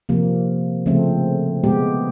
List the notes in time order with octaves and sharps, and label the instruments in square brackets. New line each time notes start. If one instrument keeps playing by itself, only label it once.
[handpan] C3 F3 A#3
C#3 F3 A3 C4
B2 G#3 B3 G4